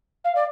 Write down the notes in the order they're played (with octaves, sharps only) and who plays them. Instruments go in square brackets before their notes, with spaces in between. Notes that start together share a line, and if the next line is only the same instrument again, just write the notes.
[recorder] F5
D5